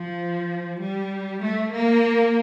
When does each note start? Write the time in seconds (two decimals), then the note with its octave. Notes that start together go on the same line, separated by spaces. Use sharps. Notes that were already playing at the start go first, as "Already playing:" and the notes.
Already playing: F3
0.80 G3
1.42 A3
1.73 A#3